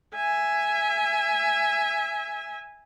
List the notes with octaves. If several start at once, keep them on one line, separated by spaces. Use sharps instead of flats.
E5 G#5